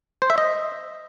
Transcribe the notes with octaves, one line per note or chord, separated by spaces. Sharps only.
C5
E5
D#5